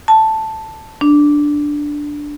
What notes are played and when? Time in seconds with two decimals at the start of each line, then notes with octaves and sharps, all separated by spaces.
0.08 A5
1.01 D4